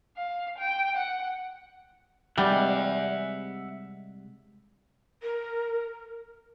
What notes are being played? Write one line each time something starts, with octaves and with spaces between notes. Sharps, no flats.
F5
G5
F#5
C3 G3 G#3 E5 F#5
A#4